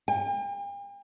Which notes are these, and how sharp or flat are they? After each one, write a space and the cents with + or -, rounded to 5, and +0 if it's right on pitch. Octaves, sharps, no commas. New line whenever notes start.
G5 +45